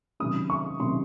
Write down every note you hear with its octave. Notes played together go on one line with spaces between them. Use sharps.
C3 D#3 F#3 A#3 C#4 D#6
C#6
C3 D#3 F#3 A#3 C#4 C6